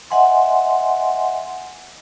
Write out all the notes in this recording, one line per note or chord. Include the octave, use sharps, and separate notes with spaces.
D#5 E5 F#5 G#5 C6